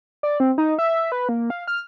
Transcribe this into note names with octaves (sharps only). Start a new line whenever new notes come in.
D5
C4
D#4
E5
B4
A#3
F5
F6